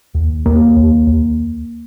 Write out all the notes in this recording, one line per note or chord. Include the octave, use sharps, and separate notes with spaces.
D#2
D#2 A#3
D#2
D#2